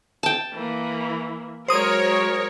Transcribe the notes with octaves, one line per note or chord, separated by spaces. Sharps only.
G5 A5
E3 A#3
F#3 G#3 A#4 C5 C#5 D#6